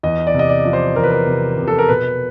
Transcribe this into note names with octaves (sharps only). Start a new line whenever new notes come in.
E2 D#5
D5
C3
D#5
D5
F3
C5
E2 A#4
B4
A#4
C3
C3
A4
A#4
B2 B4